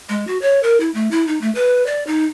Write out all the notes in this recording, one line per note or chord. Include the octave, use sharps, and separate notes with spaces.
G#3
F#4
C#5
A#4
E4
A3
E4
D#4
A3
B4
D5
D#4